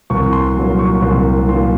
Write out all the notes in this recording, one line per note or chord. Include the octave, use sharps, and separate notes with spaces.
C2 C#6
C6
A#2 F#3 A#3
C#6
C2 C6
A#2 F#3 A#3 C6